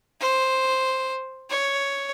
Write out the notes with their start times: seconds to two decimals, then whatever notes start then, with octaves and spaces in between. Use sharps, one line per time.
0.20 C5
1.50 C#5